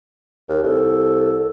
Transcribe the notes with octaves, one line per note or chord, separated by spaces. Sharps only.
D#2
C2 A4